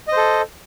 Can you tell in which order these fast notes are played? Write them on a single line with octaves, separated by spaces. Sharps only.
D#5 C5 A4